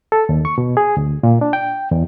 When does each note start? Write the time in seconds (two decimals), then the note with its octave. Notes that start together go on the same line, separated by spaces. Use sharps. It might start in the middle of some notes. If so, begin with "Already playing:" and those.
0.12 A4
0.29 D#2
0.45 C#6
0.58 B2
0.77 G#4
0.97 D2
1.23 A#2
1.41 D4
1.53 G5
1.91 E2